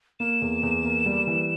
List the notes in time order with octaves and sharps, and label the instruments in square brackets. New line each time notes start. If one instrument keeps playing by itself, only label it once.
[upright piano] A#3 [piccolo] E7
[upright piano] E2
E2
A#3
G3
E3